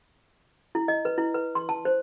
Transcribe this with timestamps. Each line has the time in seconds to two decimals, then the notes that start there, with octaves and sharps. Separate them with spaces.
0.75 E4
0.88 D#5
1.05 B4
1.18 E4
1.34 B4
1.55 C6
1.69 A5
1.85 C5